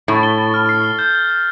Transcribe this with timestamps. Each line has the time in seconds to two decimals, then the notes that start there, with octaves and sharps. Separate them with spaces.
0.08 A2 A6
0.23 G7
0.38 A6
0.54 F6
0.69 C7
0.84 G7
0.99 G6
1.15 G7
1.30 G6